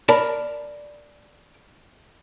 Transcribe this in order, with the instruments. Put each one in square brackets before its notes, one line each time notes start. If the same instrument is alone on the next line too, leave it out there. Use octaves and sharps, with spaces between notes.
[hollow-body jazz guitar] A#4 D5 A5 B5